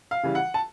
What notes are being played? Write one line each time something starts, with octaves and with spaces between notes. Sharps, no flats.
F5
C#3 E3 G3
F#5
A5